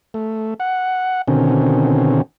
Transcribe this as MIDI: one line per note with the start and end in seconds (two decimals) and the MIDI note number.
0.14 0.54 57
0.60 1.22 78
1.28 2.22 47
1.28 2.22 50
1.28 2.22 51
1.28 2.22 60
1.28 2.22 61